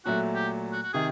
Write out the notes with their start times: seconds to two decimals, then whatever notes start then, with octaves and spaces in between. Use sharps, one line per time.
0.05 A#2 F#3 A3 F#4
0.34 G4
0.72 F#4
0.83 F#4
0.93 C3 D#3 G#4